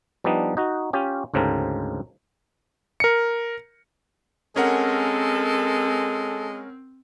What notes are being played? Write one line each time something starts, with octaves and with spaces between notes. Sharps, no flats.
F3 G3 B3 D4 D#4
D#4 F#4
C#4 F4 G4
D2 G#2 C#3 C4 A4 A#4
A#4 C#7
G#3 C4 C#4 A4 A#4 F#5